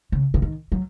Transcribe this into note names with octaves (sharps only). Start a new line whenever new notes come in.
C#3
C#3
D#3
F#3